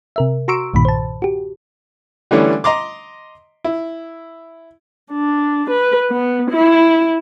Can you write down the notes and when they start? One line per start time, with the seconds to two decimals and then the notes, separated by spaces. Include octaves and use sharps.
0.16 C3 A#4 E5
0.48 F#4 A#5 C6 C#6 E6 D7
0.74 B1 G2 A#2 D#3 B5
0.85 C5 A5
1.22 F#4 G4
2.31 D3 E3 G3 A3 C#4
2.64 D#5 A#5 C6 D6
3.64 E4
5.12 D4
5.70 B4
6.11 B3
6.51 E4